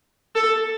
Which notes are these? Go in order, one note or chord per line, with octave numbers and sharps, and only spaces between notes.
A4